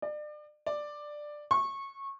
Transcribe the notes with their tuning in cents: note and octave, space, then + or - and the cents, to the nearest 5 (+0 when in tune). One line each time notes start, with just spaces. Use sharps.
D5 +35
D5 +10
C#6 -20